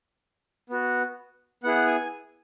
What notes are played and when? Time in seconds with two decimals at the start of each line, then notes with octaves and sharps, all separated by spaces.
0.70 B3 F#4
1.63 B3 E4 G#4 F#5
1.87 G#5